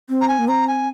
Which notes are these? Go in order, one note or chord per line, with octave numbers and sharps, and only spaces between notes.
C4
A#5
G#5
A#3
C4 A#5
G#5